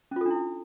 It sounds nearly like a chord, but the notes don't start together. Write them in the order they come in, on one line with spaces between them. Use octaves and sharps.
C#4 F4 A4 D4 E4